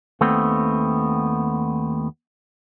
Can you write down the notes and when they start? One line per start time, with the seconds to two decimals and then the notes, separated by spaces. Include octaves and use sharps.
0.21 D#2 A3 B3 C4